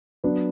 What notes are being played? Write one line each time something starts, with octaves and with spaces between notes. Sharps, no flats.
F#3 B3 D4